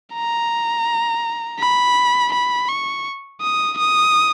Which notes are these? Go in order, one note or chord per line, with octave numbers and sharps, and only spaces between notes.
A#5
B5
B5
C#6
D#6
D#6